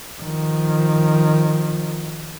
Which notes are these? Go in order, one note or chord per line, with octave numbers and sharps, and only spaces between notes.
D#3 F3